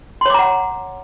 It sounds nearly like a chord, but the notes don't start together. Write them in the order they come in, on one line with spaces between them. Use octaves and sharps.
C6 C#5 D6 A#5 F#5